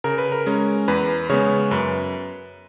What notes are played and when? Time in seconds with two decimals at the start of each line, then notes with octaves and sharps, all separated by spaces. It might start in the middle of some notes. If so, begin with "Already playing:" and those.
0.04 C#3 A#4
0.18 B4
0.32 A#4
0.47 G#3 C#4
0.88 E2 B4
1.29 C#3 G#3 B3 C#5
1.71 F#2 B4